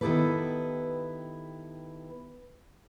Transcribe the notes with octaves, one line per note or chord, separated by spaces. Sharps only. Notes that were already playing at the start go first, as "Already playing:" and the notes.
D#3 B3 E4 G4 A4 B4